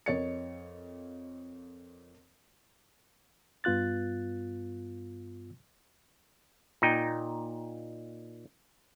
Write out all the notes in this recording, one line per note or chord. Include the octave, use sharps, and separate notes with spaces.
F2 A#4 C#5 D#5 A6 C#7
G2 B3 F4 F#6 A6
A#2 D#4 G5